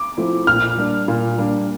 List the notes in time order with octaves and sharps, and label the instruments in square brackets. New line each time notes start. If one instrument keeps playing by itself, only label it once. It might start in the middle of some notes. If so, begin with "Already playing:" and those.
Already playing: [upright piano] D6
[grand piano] F3 A3 C4 E4
[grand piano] A#2 [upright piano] F6
[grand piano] G3 A#3 D4
A#2
G3 A#3 D4